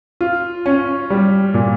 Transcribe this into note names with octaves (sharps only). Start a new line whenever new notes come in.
F4
C#4
G3
A#2